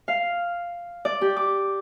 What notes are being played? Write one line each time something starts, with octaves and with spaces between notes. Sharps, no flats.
F5
D5
G4
D6